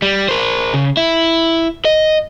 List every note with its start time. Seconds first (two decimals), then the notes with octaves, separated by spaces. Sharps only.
0.02 G3
0.29 A#4 C5
0.74 C#3
0.97 E4
1.85 D#5